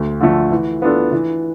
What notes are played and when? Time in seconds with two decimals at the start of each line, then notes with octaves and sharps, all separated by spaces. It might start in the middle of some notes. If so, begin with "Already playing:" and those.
Already playing: D2
0.21 D3 F3 A3
0.51 E3
0.82 B3 D4 F4 A4
1.12 E3